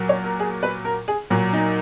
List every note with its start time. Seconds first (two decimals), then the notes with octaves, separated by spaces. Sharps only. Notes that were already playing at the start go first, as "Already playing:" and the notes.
Already playing: A#2 F#3
0.09 C#5
0.24 A#4
0.40 G#4
0.63 B4
0.85 A#4
1.08 G#4
1.30 A#2 F#3
1.53 D#4